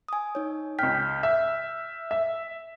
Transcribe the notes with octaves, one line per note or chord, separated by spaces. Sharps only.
G#5 D#6
D#4 C#5
C#2 G5 F6 G6 B6
E5
E5